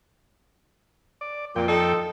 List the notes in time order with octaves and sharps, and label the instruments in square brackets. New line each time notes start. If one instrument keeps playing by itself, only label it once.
[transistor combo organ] D5
[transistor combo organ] F2 G5 [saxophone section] A#2
[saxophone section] D#4 A4